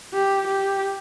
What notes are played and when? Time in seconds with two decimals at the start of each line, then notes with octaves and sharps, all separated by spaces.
0.14 G4
0.47 G4